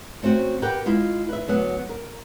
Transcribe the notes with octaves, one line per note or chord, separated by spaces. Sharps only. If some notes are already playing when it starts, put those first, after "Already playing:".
A3 C4 C#4 F#4
G4 A#4 B4 F#5 G5
G#3 E4 F4
B4 E5
D2 F#3 B3
A#4